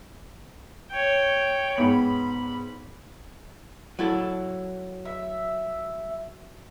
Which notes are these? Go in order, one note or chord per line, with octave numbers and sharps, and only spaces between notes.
C#5 G5
G#2 B3 B5
F#3 E4 A4
E5